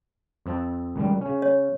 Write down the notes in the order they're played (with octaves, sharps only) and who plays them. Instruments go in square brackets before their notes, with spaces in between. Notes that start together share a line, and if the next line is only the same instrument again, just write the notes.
[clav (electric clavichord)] F2 C4 A5
C#2 D#3 G3
C#3 C#4
[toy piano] C#5